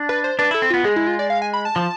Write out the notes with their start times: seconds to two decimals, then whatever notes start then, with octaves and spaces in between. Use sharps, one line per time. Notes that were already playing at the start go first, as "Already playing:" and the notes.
Already playing: D4
0.09 B4
0.24 C5
0.39 D4 B4
0.51 E4 A4
0.62 C4
0.70 B3 F4
0.84 G#3 G#4
0.96 E4
1.07 F4
1.19 D5
1.30 F5
1.42 G#5
1.53 B5
1.65 A5
1.76 F3